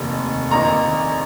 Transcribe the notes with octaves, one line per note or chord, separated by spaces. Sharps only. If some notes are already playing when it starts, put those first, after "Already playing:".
Already playing: F1 D#2 D#3
A#1 D#3 A#5